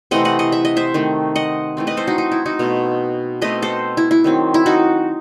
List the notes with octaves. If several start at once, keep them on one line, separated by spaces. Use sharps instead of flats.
C3 E3 A3 C4 D#5 F#5
D#5 F#5
D#5 F#5
E5
D#5
C5 E5
D#3 A3 C4
D#5 F#5
E3 A3 C4
B4 D#5
A4 C5
D#4 F#4
D#4
E4
D#4 F#4
B2 A3 C4
B2 A3 C4 B4 D#5
A4 C5
E4
E4
D#3 F#3 C4
E4
D#4 F#4